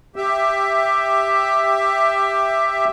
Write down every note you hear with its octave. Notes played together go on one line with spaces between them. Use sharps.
G4 E5